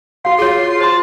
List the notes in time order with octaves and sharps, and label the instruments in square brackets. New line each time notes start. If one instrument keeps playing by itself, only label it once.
[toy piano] F#4 F5 [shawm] C6
[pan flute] F4 [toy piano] G#4 C#5
[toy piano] C5 C6 [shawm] A5